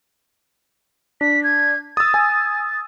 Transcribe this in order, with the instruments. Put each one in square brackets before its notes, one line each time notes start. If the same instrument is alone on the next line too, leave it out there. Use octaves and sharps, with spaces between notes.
[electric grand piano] D4 [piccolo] B6
[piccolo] G#6
[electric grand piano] D#6 E6 [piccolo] A6
[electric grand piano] G#5